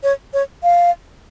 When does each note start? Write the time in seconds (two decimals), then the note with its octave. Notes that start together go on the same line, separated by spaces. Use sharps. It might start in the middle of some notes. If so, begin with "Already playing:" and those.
0.03 C#5
0.34 C#5
0.63 F5